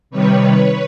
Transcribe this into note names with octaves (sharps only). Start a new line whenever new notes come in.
C3 D#3 G3 B4 C#5